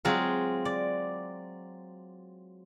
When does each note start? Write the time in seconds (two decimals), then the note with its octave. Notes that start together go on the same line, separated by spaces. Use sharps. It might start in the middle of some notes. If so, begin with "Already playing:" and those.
0.05 F#3 G#3 C4 F4
0.65 D5